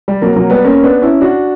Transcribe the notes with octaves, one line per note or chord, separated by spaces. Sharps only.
G3
F#3 A#3
F#3 A#3
G3 B3
A#3 C#4
B3 D4
C#4 E4
D4 F#4